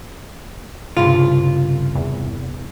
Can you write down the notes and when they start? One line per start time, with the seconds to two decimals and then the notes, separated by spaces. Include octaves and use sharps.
0.97 C2 G2 C#3 F4
1.95 E2